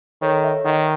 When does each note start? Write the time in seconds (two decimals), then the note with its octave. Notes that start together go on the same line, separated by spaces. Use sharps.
0.22 D#3 A4 C#5
0.44 C#5 E5
0.65 D#3 D#5 F#5